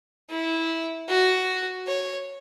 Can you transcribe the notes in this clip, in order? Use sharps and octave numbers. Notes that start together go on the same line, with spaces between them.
E4
F#4
C#5